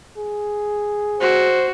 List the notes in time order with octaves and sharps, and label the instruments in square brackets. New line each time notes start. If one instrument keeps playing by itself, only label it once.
[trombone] G#4
[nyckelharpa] F#4 [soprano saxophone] C5